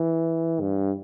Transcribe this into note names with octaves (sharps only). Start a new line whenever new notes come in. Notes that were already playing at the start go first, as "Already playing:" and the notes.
Already playing: E3
G2